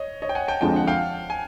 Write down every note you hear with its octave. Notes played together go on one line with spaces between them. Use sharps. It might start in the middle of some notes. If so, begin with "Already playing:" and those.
Already playing: C#5 D#5
C#5 D#5
G5
F#5 G#5
G5 A5
F2 D3 F3 G#3 G5 A5
F#5
F5 G5
G#5